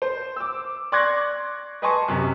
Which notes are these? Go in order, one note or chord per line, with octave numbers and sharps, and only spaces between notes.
C5
D6 E6
D5 C6 C#6 F#6 G#6 A#6
B4 D#5 G#5 A5 C6 C#6
F#2 C3